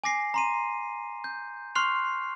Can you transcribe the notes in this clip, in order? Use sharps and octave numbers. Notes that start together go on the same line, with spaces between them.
G#5 D6 A#6 C7
A#5 C6 D#7
G6
C6 C#6 F6 F#6 C7 F7